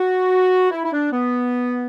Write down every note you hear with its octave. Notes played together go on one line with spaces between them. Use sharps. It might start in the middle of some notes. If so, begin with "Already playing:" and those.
Already playing: F#4
E4
E4
D4
B3